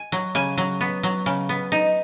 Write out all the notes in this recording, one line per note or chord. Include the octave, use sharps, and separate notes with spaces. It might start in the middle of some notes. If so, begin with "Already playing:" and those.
Already playing: G#5
F#3
C#3 G#5
F#3
B3
F#3
C#3
B3
D#4